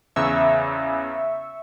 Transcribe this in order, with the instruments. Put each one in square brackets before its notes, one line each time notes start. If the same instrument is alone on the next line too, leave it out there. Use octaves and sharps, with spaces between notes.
[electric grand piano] E2 C#3 [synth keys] E5 C#6